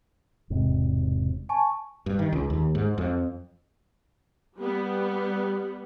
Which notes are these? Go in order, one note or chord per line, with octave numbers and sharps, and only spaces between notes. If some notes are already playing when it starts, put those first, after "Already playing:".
E1 G#2 C3
G#5 A5 C#6
G2
D#3
C#2
D#2
G#2
F2
G3 B3